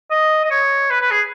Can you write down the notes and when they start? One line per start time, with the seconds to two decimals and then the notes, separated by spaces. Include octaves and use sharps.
0.11 D#5
0.44 D#5
0.50 C#5
0.91 B4
1.01 B4
1.11 G#4